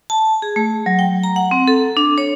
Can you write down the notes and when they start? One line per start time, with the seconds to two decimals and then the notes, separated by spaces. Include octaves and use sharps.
0.10 A5
0.42 G#4
0.56 A3
0.86 F#3
0.99 G5
1.24 A#5
1.36 F#5
1.51 C4
1.68 A4
1.97 D4
2.18 C#5